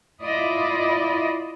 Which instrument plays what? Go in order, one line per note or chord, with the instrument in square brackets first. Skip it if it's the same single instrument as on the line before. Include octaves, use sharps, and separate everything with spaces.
[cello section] E4 F4 D5 D#5